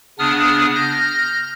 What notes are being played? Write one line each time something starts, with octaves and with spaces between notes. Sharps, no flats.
C#3 B3 D4 D#6 F6
F6 G6 A#6